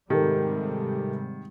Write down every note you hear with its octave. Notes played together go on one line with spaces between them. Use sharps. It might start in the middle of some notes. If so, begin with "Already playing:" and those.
G#2 C3 D#3 G3 G4 A4 A#4